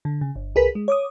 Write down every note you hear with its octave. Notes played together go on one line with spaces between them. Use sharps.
D3
C#3
G1
C2 G#4 A#4 B4 B6
G#3
C#5 D6 D#6